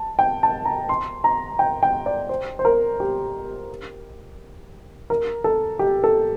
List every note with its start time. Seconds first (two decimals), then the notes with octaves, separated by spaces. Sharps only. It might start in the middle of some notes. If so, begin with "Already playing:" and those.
Already playing: A5
0.19 G5
0.43 A5
0.65 A#5
0.89 C6
1.24 A#5
1.59 G5
1.83 G5
2.06 D5
2.29 C5
2.59 C5
2.65 A#4
3.00 G4
5.10 A#4
5.44 A4
5.79 G4
6.04 A4